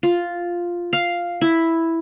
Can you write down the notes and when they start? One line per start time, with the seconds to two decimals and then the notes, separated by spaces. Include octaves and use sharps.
0.03 F4
0.93 F5
1.41 E4